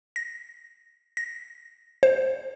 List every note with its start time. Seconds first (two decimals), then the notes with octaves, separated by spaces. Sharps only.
0.16 A#6
1.17 A#6
2.03 C5